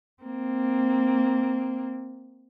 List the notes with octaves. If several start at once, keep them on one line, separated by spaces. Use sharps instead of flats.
A#3 C4